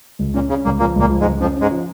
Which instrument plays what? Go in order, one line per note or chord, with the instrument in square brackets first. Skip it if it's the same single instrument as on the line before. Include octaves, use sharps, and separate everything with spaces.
[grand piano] C#2
[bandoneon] A#2 [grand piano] C#4
[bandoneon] C#3 [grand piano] C#4
[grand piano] C#2 [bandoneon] A#2 A#3
[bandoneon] A#2 A#3 [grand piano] F3
[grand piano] C#2 [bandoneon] A#2 A#3
[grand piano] F3
[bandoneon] G#2 G#3
[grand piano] C#2
[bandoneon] F2 F3 [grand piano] C#4
[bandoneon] G#2 G#3 [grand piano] C#4
[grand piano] F3